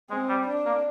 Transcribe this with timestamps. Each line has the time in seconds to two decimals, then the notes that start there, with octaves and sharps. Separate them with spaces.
0.10 G#3 C4
0.29 G3
0.47 D4
0.66 A#3